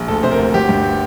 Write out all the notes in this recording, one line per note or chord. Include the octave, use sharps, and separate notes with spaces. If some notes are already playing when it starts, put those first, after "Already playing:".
Already playing: A#1
D2 A4
C3 C5
A#4
D2
G1 G4
G2